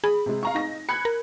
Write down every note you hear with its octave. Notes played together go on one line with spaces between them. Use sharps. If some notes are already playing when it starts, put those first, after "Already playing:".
G#4 B5
C3 G#3
F5 A#5 C#6
D#4 A#6
B5 F#6 G#6 C#7
A#4